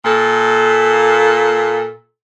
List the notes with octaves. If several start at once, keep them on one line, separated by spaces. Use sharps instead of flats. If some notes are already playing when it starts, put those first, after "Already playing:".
A#2 A4